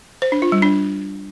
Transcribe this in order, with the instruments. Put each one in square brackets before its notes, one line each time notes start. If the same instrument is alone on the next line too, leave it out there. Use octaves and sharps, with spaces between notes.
[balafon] C5
D4
F4
G3
D4